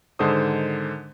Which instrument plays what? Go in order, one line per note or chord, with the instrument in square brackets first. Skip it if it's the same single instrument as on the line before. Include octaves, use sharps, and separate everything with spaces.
[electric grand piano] G#2 D3 D#3 A4 C5 D#6